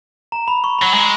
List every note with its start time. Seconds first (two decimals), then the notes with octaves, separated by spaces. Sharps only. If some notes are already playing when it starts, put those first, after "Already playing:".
0.32 A#5
0.48 B5
0.64 C#6
0.79 B5
0.82 F#3
0.94 G#3 A#5